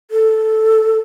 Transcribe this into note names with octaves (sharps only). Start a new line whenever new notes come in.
A4